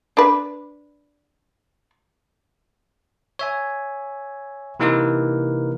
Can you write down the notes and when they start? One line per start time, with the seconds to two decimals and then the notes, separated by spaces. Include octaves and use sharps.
0.17 D4 B4
3.39 C#5 E5 G#5
4.80 C3 E3 A#3 D#4 A#4 B4